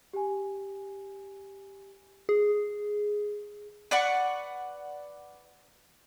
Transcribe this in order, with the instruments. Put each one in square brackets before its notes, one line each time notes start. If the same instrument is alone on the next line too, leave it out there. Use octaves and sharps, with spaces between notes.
[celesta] G4 G#5
[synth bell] G#4
[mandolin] B4 D5 F#5 C#6